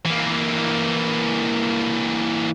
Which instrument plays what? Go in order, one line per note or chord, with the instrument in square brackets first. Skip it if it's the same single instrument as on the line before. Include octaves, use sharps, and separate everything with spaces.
[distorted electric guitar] E3 A#3